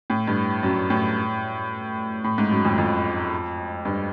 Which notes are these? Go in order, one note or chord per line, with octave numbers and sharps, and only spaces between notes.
A2
G2
F#2
A2
A2
G#2
F#2
F2
F2
G2